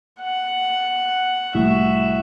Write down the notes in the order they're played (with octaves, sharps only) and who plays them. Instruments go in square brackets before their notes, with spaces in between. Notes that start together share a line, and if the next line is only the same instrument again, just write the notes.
[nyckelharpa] F#5
[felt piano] C2 A2 [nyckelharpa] F#4 E5